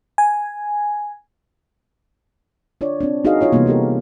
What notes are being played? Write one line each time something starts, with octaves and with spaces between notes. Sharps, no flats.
G#5
D4 F4 C#5 D5
C4 D4
D#4 F#4 G#4 A#4 D#5 F5
F4 C#5 D#5
C3 E3 G3 A#3 B3
C4 G4 A4 A#4